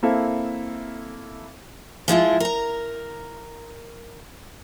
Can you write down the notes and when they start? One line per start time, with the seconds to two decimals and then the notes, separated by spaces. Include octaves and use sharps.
0.03 A#3 C4 E4 A4 E5 F5
2.08 F3 G#3 E4 F4
2.40 A#4 A#5